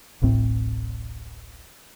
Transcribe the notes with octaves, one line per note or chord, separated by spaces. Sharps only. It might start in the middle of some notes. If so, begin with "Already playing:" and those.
D1 A1 A2 C4